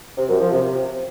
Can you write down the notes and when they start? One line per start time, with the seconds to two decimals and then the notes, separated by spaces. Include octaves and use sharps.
0.17 C3
0.29 F#2
0.40 F3
0.52 C3